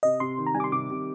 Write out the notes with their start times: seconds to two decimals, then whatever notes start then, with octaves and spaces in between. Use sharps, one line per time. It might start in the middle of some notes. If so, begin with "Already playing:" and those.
0.03 C3 D#5
0.20 C3 C6
0.38 D#3
0.46 A#5
0.54 G3 G#5
0.60 D6
0.64 C6
0.72 C3 D6
0.90 C3